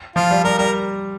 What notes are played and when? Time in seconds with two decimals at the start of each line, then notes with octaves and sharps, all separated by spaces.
0.16 F3 F4
0.31 G3
0.44 G3 A#4
0.58 G3 A#4